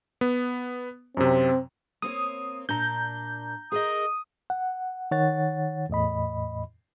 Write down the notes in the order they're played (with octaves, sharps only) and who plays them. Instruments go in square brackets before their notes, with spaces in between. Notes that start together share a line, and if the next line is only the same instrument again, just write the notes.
[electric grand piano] B3
[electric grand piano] F#2 C3 [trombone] C4
[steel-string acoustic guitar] A#3 C4 C#5 [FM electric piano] D#6
[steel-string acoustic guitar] A#2 D4 [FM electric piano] A#5 G6
[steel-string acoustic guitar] G#4 A#4 D#5 [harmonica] D#6
[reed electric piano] F#5
D#3 C#5 F#5 A6
E2 A2 D#5 B5